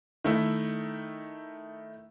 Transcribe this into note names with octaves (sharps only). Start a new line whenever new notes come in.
D#3 A3 E4